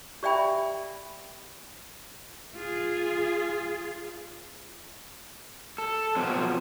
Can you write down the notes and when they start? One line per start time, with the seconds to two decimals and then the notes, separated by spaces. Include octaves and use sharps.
0.23 G4 D5 E5 G5 B5
2.55 F4 G#4
5.78 A4
6.16 B2 F3 F#3 C4